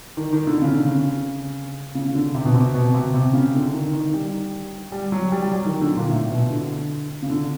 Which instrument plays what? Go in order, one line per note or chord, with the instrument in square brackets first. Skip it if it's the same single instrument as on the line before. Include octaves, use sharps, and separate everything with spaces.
[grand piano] D#3
D#3
D3
C#3
D3
C#3
C#3
C#3
D3
C3
B2
C3
B2
C3
C3
C#3
D3
D#3
D#3
G3
G3
F#3
G3
G3
F#3
D#3
D3
A#2
A2
B2
D3
C#3
D3